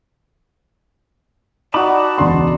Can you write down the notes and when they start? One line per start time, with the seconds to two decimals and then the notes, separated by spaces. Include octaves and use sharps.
1.74 D#4 F#4 D5 A5 B5 D6
2.18 E1 C#2 C6